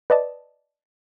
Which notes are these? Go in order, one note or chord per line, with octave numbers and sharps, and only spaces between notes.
B4 D5 D#5 A5